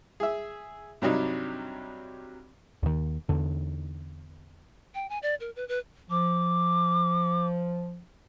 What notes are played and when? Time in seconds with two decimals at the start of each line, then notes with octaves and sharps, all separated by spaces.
0.20 G#4 E5
1.02 G2 C3 F#3 G3 D4 D#4
2.83 D#2 D#3
3.29 E2 D3
4.94 G5
5.10 G#5
5.23 D5
5.40 A#4
5.56 B4
5.69 B4
6.10 F3 D6